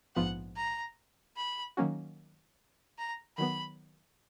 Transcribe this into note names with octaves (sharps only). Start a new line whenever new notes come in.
A#1 G#2 F3 B3 F4 F#5
A#5
B5
D#3 F#3 A#3 C#4 F#4
A#5
D#3 F#3 B3 B5